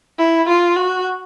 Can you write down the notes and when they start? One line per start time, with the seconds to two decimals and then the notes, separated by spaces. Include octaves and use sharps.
0.18 E4
0.48 F4
0.76 F#4